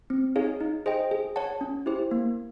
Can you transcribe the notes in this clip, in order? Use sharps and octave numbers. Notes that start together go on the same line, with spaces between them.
C4
D#4 G#4 C#5 F5
D#4
G#4 C5 D#5 G5
G#4
C#5 F#5 A5
C#4
E4 G4 C5
A#3